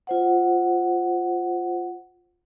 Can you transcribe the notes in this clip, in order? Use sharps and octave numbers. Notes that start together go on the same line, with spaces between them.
F4 C5 F#5